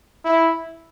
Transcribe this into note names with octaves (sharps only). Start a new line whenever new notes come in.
E4